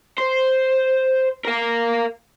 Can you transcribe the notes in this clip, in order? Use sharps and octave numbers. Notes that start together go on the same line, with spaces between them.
C5
A#4 F5